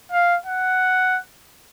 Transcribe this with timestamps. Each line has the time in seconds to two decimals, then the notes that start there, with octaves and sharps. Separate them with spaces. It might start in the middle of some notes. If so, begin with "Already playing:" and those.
0.12 F5
0.46 F#5